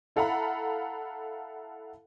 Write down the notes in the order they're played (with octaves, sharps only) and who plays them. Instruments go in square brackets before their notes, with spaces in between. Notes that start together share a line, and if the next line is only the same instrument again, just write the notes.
[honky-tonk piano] E4 A4 F5 F#5 A#5 B5